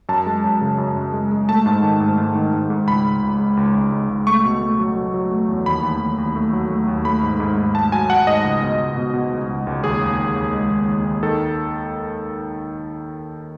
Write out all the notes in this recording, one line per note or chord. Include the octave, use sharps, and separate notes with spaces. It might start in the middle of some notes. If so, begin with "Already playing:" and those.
F#2 A5
G#3
F#2
C#3
F#2
F#2
G#3
G#3
A3 A5
G#2
D#3
G#2
G#2
D#3
G#2
G#2
C#2 B5
C#2
C#2
G#3
C#2
C#2
G#3
C#2
A3 C#6
B2
A3
F#3
F#3
F#3
A3
E2
D#2 B5
D#2
D#2
D#2
A3
F#3
A3
D#2
A3 B5
G#2
G#2
G#2
A3 A5
F#3 G#5
F#3 F#5
G#2 D#5
C#2
B2
C#2
B2
B2
C#2
C#2
C#2
D#2 G#4
D#2
D#2
D#2
G#3
D#2
D#2
D#2
D#3 A4